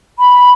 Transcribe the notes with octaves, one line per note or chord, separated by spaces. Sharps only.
B5